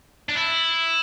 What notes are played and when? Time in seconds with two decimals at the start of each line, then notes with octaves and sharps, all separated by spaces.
0.29 D4
0.35 E4